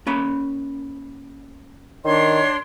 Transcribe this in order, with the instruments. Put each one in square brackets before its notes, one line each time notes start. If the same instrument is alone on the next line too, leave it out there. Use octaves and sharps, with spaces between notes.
[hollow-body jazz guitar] A#3 C#4 B5
[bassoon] D#3 [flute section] D4 C#5 C6